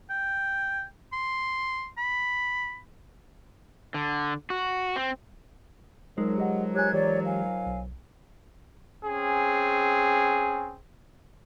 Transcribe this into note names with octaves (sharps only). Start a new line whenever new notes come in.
G5
C6
B5
D3
F#4
C4
D#3 F3 F#3 G#3 D#4 G#4 A#4
G4 D#5 F#5
G4 C#5 G#5 F#6 G#6
E3 G4 C#5 D5
F5 G#5
B1
C4 C#4 G#4